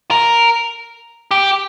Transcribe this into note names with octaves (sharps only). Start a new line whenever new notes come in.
A#4
G4